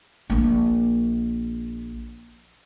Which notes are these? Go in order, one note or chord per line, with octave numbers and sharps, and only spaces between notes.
A#1 A#3